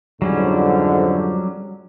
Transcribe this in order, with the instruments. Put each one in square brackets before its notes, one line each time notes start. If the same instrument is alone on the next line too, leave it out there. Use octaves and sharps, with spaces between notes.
[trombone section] F2 G#2 D3 [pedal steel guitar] F#3 G3 C#4